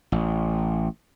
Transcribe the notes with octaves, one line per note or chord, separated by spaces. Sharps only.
A1